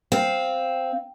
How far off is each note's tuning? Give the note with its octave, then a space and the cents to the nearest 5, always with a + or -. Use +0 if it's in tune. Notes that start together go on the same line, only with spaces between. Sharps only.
C4 +0 F5 +0